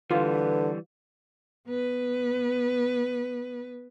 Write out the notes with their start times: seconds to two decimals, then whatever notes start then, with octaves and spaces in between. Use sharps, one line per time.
0.11 D3 E3 G3 F4 B4
1.67 B3 B4